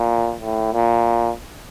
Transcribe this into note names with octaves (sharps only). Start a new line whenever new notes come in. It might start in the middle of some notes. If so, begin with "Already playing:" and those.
Already playing: A#2
A2
A#2